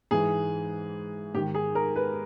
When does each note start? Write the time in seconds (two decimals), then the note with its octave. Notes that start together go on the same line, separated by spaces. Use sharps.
0.11 G#2 E3 G#4
1.34 G#2 G4
1.37 D#3
1.55 G#4
1.75 A#4
1.96 B4